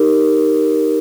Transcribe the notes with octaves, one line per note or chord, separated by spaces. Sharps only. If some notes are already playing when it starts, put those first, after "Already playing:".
Already playing: D#4 G4 A#4